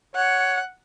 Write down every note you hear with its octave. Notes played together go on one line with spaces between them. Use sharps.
C#5 F#5